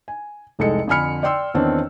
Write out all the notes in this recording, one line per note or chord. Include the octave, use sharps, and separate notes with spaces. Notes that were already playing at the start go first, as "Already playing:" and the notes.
G#5
F1 C2 G#3 D#4 A4 C#7
F2 D3 G#5 B5 F6 C#7
D5 G5 C6 E6
E2 D#3 C4 D4 C#5